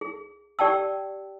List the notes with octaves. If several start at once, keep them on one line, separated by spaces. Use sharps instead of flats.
G#4
G4 D5 G5 A5 E6